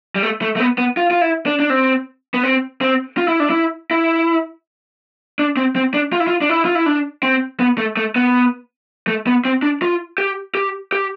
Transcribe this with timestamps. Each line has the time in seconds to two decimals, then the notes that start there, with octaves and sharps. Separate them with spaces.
0.16 G3
0.23 A3
0.42 A3
0.56 A3
0.60 B3
0.78 B3
0.97 F4
1.11 F4
1.21 E4
1.46 D4
1.60 D4
1.70 C4
2.34 B3
2.43 C4
2.81 C4
3.17 F4
3.28 E4
3.40 D4
3.50 E4
3.91 E4
5.39 D4
5.57 C4
5.76 C4
5.94 D4
6.13 F4
6.20 E4
6.27 F4
6.41 D4
6.49 E4
6.65 F4
6.75 E4
6.86 D4
7.23 C4
7.60 B3
7.78 A3
7.97 A3
8.16 B3
9.08 A3
9.27 B3
9.45 C4
9.63 D4
9.82 F4
10.18 G4
10.55 G4
10.92 G4